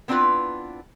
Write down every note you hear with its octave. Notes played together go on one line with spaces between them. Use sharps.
B3 C4 D4 E4 F4 B4